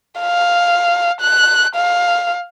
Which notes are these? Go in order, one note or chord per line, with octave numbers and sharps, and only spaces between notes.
F5
F#6
F5